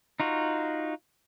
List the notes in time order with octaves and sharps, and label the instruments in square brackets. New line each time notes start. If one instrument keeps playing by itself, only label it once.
[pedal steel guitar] D#4 F4 F#4